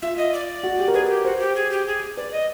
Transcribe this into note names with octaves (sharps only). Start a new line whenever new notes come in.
F4 E5
D#5
D5
F#4
G4
A#4
G#4 B4
G#4
G4
F#4 C5
G#4
G4
G#4
G4
G#4
B4 D5
D#5